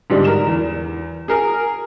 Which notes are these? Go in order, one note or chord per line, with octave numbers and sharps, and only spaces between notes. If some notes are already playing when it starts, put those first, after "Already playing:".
G#2 D3 G3 G#3
A#4 E7
E2
G#4 A#4 G#5